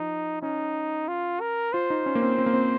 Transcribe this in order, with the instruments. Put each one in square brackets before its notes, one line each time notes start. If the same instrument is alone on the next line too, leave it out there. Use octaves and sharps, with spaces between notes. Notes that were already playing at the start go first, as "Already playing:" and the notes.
Already playing: [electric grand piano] F3 [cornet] D#4
[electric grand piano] C#4 [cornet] D#4
[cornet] F4
A#4
[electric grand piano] F4 [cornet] C5
[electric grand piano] D#4
C#4
A#3
C4
C4
A#3
C4